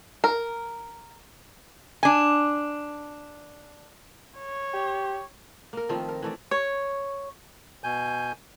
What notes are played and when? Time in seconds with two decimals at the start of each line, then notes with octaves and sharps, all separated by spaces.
0.24 A#4
2.03 D4 G#5
4.39 C#5
4.73 G4
5.73 A#3 A#4
5.89 D#3 F3 A3 C4
6.08 A#4
6.22 E3 A3 D5
6.51 C#5
7.84 B2 G#5 G6